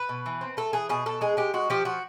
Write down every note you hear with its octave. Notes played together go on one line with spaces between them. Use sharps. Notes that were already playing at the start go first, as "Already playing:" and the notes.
Already playing: B4
B2
E3
C4
A3 A4
E3 G#4
B2 G#4
B2 A4
G#3 G#4
G#3 G4
G#3 F#4
F3 G4
F3 F#4